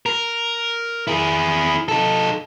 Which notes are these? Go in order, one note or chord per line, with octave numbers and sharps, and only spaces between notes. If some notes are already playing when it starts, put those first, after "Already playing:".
A#4
E4 G#4
D#4 A4